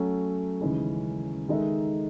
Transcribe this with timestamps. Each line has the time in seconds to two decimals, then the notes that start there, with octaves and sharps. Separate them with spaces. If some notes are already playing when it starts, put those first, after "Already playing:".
Already playing: F#3 A3 C#4
0.61 D#2 C#3 E3 G#3 C#4
1.48 D#3 G#3 D#4 A4 E5